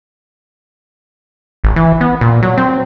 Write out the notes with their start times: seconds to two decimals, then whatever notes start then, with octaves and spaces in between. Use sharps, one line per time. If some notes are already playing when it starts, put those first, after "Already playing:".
1.64 G#1
1.76 E3
2.01 B3
2.21 A#2
2.43 F#3
2.57 C4